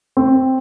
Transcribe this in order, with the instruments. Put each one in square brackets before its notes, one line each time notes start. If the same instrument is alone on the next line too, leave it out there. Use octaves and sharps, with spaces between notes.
[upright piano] C4